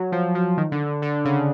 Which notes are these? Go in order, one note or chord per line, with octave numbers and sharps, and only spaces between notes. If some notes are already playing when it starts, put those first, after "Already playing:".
Already playing: F#3
F3
F3
D#3
D3
D3
C#3